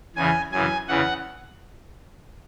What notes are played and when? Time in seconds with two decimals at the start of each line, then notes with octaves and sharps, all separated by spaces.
0.16 E2 C#3 E3 G#5
0.52 F#2 C#3 E3 G#5
0.89 E2 C#3 E3 F#5